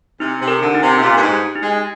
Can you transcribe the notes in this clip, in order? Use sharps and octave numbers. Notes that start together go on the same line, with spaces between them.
C3 D#4
C3
A#4
D3
D#4
C3
C3
A#2 G4
G2
G#2
G4
D#4
G#3